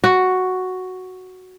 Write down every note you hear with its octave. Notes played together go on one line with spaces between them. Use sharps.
F#4